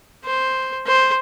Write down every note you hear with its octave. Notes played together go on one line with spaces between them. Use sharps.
C5
C5